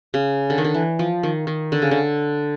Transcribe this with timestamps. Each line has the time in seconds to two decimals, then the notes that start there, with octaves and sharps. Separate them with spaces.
0.14 C#3
0.50 D3
0.58 D#3
0.64 D3
0.74 E3
0.99 F3
1.23 D#3
1.47 D#3
1.72 D3
1.82 C#3
1.91 D3